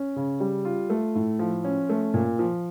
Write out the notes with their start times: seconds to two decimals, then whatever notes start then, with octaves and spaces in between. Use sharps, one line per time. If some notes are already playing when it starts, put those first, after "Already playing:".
Already playing: C#4
0.16 C#3
0.40 G3
0.65 F4
0.90 A3
1.15 A2
1.39 F3
1.64 C#4
1.89 A3
2.14 A#2
2.39 F3